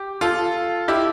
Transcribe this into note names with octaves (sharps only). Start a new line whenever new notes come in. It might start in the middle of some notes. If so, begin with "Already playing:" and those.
Already playing: G4
F4 A4
E4 G4